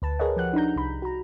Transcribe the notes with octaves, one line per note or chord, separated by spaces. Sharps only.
D2 B4 A5
G#4 A#4 B4 C#5 D#5 F#5
F3 G4 F#5 F#6
D4 D#4 A#5 G6
C2 B5
F#4 A#5